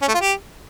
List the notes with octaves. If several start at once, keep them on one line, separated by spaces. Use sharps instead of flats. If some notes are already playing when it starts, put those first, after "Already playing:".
C#4
A3
F4
G4